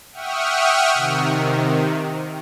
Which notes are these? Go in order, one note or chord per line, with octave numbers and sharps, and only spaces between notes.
E5 F#5 G5 C#6 D#6 F6
C3 D#3